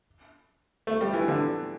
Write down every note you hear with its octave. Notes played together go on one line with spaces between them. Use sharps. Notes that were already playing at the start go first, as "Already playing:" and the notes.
A3
G3
E3
D3